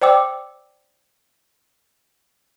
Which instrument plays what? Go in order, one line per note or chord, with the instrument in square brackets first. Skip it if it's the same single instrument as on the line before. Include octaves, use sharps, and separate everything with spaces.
[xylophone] C5 D5 G5 D6 E6